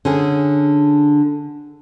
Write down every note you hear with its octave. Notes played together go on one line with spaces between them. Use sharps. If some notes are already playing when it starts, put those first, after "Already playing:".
D3 C#4 G#4